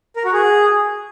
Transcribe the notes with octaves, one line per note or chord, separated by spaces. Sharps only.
A#4
F#4
G#4